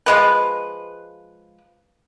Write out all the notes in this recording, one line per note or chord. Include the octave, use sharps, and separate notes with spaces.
F3 G#3 B4